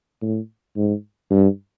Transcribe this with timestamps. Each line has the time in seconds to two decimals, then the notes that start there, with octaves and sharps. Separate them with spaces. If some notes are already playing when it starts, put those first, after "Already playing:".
0.22 A2
0.76 G#2
1.31 G2